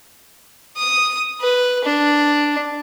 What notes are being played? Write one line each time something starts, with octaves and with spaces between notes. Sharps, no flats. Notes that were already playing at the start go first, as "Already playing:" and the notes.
D#6
B4
D4